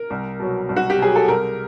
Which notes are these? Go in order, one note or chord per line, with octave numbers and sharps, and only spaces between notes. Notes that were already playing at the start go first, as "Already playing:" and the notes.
Already playing: A#4
C2
B2 F#3
C2
F#4
G4
B2 F#3 G#4
A4
C2 A#4